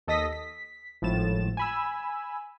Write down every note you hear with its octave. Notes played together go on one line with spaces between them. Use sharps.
D#2 A4 D#5 D#6 A#6 B6
B6
G#1 A2 F3 A6 E7
G#5 B5 E6